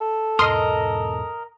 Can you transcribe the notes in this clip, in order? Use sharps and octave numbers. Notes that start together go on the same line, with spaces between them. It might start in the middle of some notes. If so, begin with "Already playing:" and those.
A4
E2 G#2 B2 A#4 D#5 C6 D#6 F6